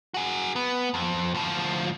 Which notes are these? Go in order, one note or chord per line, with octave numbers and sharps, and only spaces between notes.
F#4 G#4
B3
F2
D2 F3